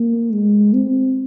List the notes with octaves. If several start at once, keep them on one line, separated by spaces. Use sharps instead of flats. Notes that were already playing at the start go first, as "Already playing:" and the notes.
Already playing: A#3
G#3
C4